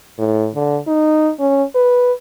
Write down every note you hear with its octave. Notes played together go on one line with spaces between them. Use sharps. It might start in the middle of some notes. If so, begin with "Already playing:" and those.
A2
D3
D#4
C#4
B4